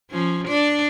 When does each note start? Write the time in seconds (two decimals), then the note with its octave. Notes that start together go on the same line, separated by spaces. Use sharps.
0.10 F3 C#4
0.48 D4 D5